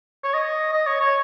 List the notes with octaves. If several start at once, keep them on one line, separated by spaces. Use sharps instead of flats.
C#5
D#5
D#5
C#5
C#5